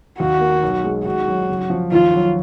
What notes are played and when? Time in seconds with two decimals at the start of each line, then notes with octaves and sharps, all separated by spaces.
0.19 D#2 F#4
0.40 A#3
0.63 B1
0.84 G#3
1.05 G#1 F#4
1.27 F#3
1.49 F#1
1.70 F3
1.92 D#2 F4
2.14 F#3